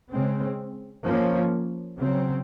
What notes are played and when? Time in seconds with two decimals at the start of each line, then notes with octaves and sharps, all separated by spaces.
0.11 C#3 G#3 C4
1.05 F3 A#3 C#4
1.98 C#3 F#3 C4